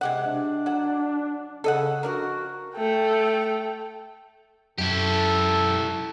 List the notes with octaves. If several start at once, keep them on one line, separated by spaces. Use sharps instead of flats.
C3 G#3 G4 F#5
D4
F#3 F#5
C#3 A4 D#5 F#5
F3 D4 F#4 A#4
A3 G5
F#2 E4 G4 A4